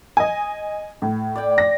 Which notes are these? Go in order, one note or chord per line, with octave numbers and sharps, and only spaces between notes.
D#5 G#5
A2
D5 G5
A#6